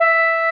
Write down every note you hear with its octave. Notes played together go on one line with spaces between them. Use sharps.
E5